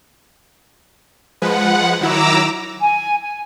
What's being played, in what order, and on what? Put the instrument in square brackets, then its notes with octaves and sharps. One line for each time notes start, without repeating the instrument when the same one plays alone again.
[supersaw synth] F3 G#3 B4 [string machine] F#5
[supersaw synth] D#3 F#3 E4 [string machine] A#5 D6 E6
[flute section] G#5
G#5